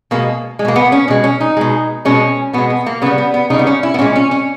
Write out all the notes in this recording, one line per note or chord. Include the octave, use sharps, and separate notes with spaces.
B2 G#3 A#3
G#3
B2 A#3
B3
C#4
B2 G#3
C#4
D#4
B2 G#3
B2 G#3 C#4
B2 G#3 B3
B3
A#3
C#3 G3 B3
B3
B3
C#3 G3 D#4
B3
C#4
E4
B3
A#2 G#3 C#4
C#4
C#4